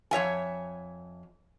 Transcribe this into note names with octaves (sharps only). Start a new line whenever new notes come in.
F2 C#5 E5 G#5